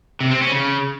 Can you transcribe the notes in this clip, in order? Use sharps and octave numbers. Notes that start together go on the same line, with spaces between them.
C3
C4
C#4
C#3